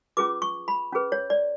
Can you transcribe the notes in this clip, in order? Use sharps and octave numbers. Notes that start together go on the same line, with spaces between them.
C#4 F4 G#4 B4 D6
C#6
B5
C#4 G#4 B4
C#5
D5